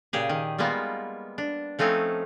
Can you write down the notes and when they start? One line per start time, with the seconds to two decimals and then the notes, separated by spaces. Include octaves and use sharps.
0.13 A#2 C#3 G4 G#4
0.29 D#3
0.58 G3 G#3 A#3 B3 F4
1.38 D4
1.79 F3 A3 C4 C#4 D#4